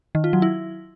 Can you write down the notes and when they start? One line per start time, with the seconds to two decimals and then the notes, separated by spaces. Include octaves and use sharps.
0.15 D#3
0.24 F4
0.33 F#3
0.42 E4